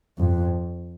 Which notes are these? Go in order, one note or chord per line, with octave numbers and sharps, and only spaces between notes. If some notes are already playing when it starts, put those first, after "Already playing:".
F2